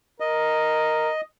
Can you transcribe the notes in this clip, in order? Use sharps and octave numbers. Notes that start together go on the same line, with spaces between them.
A#4 D#5